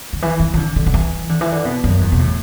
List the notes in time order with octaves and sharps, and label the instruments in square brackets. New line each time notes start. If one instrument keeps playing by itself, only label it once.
[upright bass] D3
E3
E3
E3
D3
D3
D3
E3
D3
E3
D3
B2
F#2
E2
B2
A2